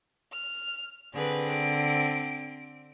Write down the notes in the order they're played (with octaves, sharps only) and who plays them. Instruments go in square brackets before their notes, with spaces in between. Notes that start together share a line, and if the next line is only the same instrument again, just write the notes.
[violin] F6
[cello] D3 C4 [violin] G#4 B4
[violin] D7